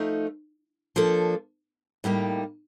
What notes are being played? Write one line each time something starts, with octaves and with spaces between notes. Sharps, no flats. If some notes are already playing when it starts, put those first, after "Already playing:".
Already playing: F3 A3 D#4
F3 A#3 D4 A4
A2 G3 A#3 D#4 G4